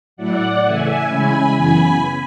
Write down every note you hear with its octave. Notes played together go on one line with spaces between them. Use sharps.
A2 F#3 A3 E4 D5 F#5
C#3 E3 A3 E5 G#5
C#3 G#3 C#4 E4 G#5 B5
F#2 C#3 E3 B3 G#5 B5